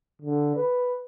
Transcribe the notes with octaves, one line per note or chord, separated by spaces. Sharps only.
D3
B4